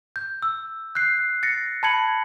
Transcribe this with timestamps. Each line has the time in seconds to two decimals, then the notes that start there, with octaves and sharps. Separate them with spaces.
0.16 G6
0.42 E6
0.95 F#6 G6 C7
1.43 A6 A#6 C#7
1.83 A5 B5 G#6 C#7 F#7